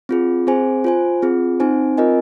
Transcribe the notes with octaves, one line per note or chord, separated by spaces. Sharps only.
C4 F4 G#4
C4 G#4 C5 G#5
F4 C5 G#5
C4 F4 G#4
C4 D#4 C5 G#5
C4 F4 A#4 D#5 G#5